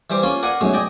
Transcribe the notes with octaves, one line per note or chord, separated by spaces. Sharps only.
E3 G3 C5 D6
A#3 C#4 F4
A#4 D5 F5 F#5 G#5
B1 F#2 A2 G#3
D5 D#5 G5 G#5